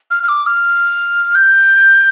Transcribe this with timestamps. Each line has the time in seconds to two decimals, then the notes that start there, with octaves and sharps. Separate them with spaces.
0.11 F6
0.23 F6
0.29 D6
0.46 F6
1.35 G6